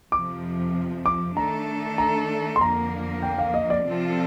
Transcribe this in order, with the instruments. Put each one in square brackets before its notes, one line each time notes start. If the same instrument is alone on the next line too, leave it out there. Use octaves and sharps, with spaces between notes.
[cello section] F2 C3 F3 [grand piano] D6
[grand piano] D6
[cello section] D#3 A3 D4 A4 [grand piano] A#5
[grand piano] A#5
C6
[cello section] F2 D3 F3 A#3 [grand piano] A#5
[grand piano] G5
F5
D#5
D5
[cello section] C3 F3 C4 F4 A4